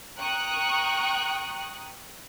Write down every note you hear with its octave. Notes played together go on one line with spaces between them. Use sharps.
G5 A#5 C#6 D#6 F#6